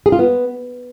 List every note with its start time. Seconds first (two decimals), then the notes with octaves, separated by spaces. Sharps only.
0.06 G#4
0.12 F4
0.19 B3